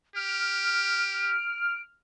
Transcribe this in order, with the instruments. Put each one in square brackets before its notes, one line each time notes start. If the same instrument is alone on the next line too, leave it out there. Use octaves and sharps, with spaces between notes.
[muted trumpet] G4 [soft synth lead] F6 [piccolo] D7